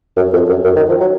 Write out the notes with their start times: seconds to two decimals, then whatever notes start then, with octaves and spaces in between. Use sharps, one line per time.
0.17 F#2
0.33 F2
0.49 F#2
0.65 F#2
0.76 D#3
0.88 F3
1.00 F#3